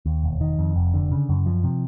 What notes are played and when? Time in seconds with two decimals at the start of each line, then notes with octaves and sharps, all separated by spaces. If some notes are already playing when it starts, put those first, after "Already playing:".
0.06 D#2
0.24 E1
0.41 D#3
0.59 F2
0.76 F1
0.94 D3
1.12 C#3
1.29 F#2
1.46 F3
1.64 C3